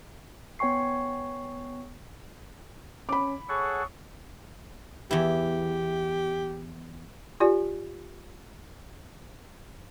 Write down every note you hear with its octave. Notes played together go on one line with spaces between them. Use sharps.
B3 C#5 G5 G#5 C#6 C7
C#4 B5 D6
G#4 A4 C#5 F#5 C#6
E2 E4 G4
F4 G4 D5 G#5